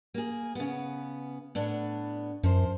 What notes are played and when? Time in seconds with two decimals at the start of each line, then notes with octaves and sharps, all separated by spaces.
0.14 A#3 G#4
0.55 C#3 B3
1.55 A2 B3 D4
2.43 F#2 F3 C5